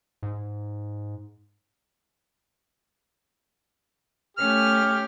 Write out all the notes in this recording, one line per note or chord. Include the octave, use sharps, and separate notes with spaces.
G#2
A3 C#4 G4 F6